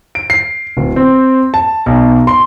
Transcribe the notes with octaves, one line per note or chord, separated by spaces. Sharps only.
D7
C7
D1
C4
A5
B1
C6